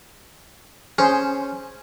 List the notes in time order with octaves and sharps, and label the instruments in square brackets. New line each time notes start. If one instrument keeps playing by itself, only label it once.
[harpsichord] C#4 [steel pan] G#4 C5